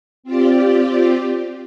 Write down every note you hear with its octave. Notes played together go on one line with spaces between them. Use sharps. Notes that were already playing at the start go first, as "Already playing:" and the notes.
C4 F4 G4 D5